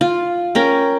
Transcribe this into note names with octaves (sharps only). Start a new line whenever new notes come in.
F4
C#4 A#4 G5